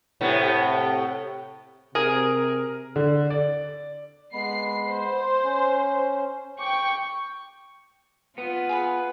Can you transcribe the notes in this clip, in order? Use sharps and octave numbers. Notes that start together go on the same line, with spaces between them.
A2 C3 B3
C3 G#4 A#4
D3
D5
G#3 B3 B5 C7
C5
C#4
G5 C#6 D6
B3 F4
G#4 B4 B5